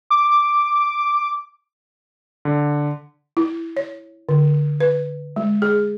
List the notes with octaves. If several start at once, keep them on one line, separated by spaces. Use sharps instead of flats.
D6
D3
E4
C#5
D3
B4
G#3
G#4